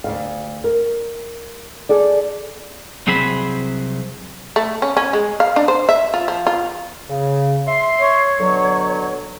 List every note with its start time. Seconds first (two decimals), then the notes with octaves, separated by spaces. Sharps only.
0.04 D2 A#2 F5
0.64 A#4
1.89 G#4 A4 D5
3.07 C2 F#3 C4 G#4 C5 B5
4.56 A3
4.82 C#4
4.97 C#4
5.13 G#3
5.40 F5
5.56 D4
5.68 C5
5.89 E5
6.14 F4
6.28 F3
6.47 F4
7.09 C#3
7.67 E5 C6
7.99 C#5
8.40 B2 D3 F#3